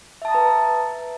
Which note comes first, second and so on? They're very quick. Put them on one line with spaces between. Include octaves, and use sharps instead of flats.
E5 A5 D#6 A#5 B4